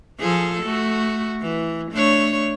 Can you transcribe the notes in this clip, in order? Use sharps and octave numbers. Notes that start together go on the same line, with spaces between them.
F3 G#4 A4
A3 F#4
E3
A3 D4 C#5